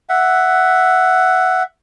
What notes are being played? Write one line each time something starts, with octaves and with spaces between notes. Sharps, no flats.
E5 F#5